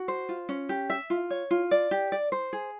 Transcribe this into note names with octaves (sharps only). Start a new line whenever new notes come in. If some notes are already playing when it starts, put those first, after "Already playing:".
Already playing: F#4
C5
F4
C#4
G4
E5
F4
C#5
F4
D5
G4
D5
C5
G#4